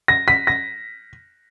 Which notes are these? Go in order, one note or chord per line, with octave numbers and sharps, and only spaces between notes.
A#6
B6
A#6